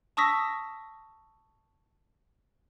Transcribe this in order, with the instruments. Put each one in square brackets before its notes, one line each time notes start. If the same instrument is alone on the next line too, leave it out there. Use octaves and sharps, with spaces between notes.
[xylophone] A5 C#6 D#6 E6 A#6 B6